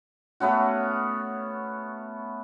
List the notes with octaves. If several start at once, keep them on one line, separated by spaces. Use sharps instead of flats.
A3 B3 C#4 F#4